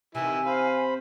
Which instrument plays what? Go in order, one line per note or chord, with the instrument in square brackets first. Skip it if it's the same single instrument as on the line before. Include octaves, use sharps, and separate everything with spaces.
[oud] C3 [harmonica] D#3 E3 E4 [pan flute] G#5
[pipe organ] C5 B5 [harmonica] F5